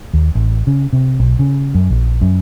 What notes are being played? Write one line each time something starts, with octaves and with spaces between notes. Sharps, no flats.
D#2
A1
C#3
C3
B1
C#3
F#2
A#1
F#2